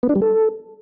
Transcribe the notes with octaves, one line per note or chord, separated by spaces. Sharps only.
B3
D4
G3
A4